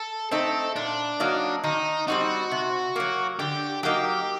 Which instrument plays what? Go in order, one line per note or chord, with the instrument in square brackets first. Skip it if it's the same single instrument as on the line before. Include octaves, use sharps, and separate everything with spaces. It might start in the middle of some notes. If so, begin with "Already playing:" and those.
Already playing: [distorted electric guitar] A4
[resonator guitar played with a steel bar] A3 C4 D#4 [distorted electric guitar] A4
[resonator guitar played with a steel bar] A#2 [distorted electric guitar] D4
[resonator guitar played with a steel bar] F#3 A#3 D#4
[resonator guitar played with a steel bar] D#3 [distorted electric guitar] D#4
[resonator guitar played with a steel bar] G3 C4 D#4 [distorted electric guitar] F#4
[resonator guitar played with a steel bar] C3
F#3 A#3
[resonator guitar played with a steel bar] D3 [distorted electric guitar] G4
[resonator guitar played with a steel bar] F#3 A#3 D#4 [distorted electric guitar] G4